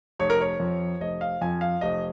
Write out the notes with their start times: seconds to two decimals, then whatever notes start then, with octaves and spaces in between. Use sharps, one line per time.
0.19 F1 C#5
0.30 A#4
0.41 C#5
0.60 F2 F3
1.01 F1 D#5
1.21 F5
1.41 F2 F3 G#5
1.61 F5
1.81 F1 D#5